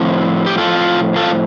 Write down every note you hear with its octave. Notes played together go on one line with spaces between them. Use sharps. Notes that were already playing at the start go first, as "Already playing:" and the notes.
Already playing: A2 F3 C4
G4
F4 A4
F4 A4